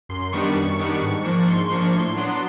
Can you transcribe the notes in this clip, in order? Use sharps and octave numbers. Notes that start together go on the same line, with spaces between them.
F#2 C6
C6
D#3 G3 B3 D4 C#6
F#2
D#3 G3 B3 D4
G#2
F3 A#3 D4
G#2 C6
F3 A#3 D4 C#6
A2 C6
F#3 B3 D4